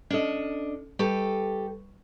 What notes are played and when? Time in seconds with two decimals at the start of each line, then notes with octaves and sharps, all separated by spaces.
0.11 C#4 D4 A4 D#5
0.99 G3 G4 A4 B4 C#6